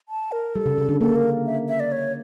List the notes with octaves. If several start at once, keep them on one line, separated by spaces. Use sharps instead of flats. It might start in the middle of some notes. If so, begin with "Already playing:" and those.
A5
A#4
G3 A4
C#3
C#3
D3
A#3 A4
A#4
E5
E5
D5
C#5